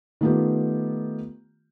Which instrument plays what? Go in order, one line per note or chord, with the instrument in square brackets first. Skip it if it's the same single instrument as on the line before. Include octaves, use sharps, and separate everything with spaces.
[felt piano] D#3 A3 B3 F4 G4